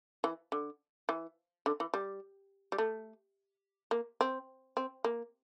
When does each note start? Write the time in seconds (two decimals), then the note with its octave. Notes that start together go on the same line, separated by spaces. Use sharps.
0.24 E3
0.52 D3
1.09 E3
1.66 D3
1.80 E3
1.94 G3
2.72 G3
2.78 A3
3.91 A#3
4.21 C4
4.77 C4
5.04 A#3